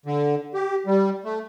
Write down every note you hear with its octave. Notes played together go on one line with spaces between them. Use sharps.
D3
G4
G3
A3